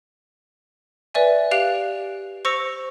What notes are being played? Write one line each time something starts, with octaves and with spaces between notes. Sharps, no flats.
B4 D5 E5 G#5
G4 F5 F#6 D7 F7
C5 C#6 E6 A#6 C#7 F7